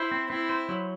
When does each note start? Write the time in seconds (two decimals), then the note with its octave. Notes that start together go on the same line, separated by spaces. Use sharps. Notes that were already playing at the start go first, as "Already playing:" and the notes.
Already playing: E4 C5
0.12 C4
0.30 C4 E4
0.49 C5
0.69 F#3